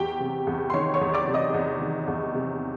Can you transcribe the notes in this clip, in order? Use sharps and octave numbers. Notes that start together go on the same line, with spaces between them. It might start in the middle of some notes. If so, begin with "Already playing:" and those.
Already playing: E2 G4 G5
C3
E2
C6
D#3 C#5 C#6
C#5 C#6
E2
D5 D6
C3
D#5 D#6
E2
D#3
E2
C3